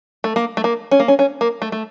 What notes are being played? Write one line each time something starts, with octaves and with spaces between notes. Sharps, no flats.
A3
A#3
A3
A#3
C#4
A#3
C#4
C#4
A#3
A3
A3